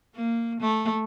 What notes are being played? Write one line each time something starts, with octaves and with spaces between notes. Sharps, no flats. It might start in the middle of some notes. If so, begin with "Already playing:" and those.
A#3
A3